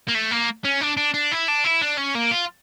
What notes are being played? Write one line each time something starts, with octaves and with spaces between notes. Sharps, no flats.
A#3
A3
A#3
C#4
D4
D4
D4
E4
D4
E4
D4
C#4
A#3
F4